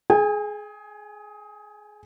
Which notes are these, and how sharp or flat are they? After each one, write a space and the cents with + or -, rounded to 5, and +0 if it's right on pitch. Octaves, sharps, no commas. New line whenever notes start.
G#4 +20 G#5 -40